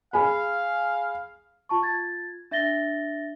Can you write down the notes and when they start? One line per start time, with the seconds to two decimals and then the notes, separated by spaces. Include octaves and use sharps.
0.13 G#4 F5 G#5 B5
1.69 F4 A5 C#6
1.82 F4 G#6 A6
2.51 D4 E5 A6 A#6 G7